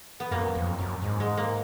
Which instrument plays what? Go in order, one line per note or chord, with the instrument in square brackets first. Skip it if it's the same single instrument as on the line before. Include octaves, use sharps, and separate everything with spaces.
[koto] B3
[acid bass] F#2 [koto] A#3
[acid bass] F2
F#2
G#2
[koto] G#3
A#3